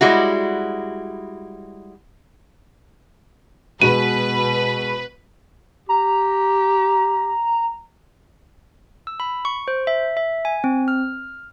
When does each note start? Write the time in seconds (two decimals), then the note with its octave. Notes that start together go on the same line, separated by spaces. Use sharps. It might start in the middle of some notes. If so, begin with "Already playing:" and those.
0.01 G3 G#3 E4 F#4
3.82 B2 G#3 F#4 B4 D#7
5.89 G4 A#5
9.07 E6
9.20 B5
9.45 C#6
9.68 C5
9.87 E5
10.17 E5
10.45 G#5
10.64 C4
10.88 F6